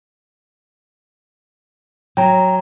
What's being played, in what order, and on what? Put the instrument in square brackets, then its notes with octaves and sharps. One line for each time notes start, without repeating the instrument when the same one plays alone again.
[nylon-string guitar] F#3 [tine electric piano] G5 A#5